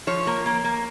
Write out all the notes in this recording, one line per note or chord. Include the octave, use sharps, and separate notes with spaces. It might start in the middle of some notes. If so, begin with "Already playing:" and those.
F3 C#5
A#3
A#3
A#3